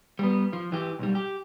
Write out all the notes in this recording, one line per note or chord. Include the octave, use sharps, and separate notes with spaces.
G3 B3
F3
E3 G4
B1 G3
G4